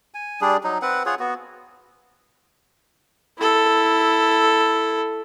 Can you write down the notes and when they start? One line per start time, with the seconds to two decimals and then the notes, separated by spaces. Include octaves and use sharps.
0.14 G#5
0.41 G3 D4 G#4
0.64 F#3 D#4
0.82 C4 B4 F#5
1.06 F4 G#4 C#5 F#5
1.19 B3 F#4
3.39 E4 A4